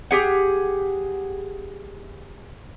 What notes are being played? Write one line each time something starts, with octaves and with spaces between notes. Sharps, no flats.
G4 G#4 F#5